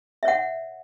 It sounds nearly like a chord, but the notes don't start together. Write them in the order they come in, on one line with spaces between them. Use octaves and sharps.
E5 C#5 F#5